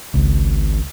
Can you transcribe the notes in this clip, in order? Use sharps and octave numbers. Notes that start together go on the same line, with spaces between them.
G#1 C#2